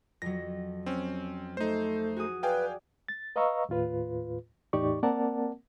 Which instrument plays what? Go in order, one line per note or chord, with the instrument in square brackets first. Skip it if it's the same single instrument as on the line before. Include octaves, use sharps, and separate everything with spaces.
[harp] F2 F#3 [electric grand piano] A#6
[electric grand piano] C4 C#4
[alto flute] A3 [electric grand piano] D#4 C5
[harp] F#4 G#4 D#6
[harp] G#4 D5 [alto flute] B4 [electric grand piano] F5 G5 G#5
[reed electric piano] A6
B4 D#5 F5 A#5 C#6 E6
D#2 A2 F4 B4
E2 A2 D#4 G4 D5 C#6
A#3 C4 A#4 D5 F#5 A5